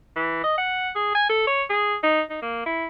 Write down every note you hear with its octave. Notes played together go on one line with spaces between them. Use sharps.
E3
D#5
F#5
G#4
G#5
A4
C#5
G#4
D#4
D#4
A#3
E4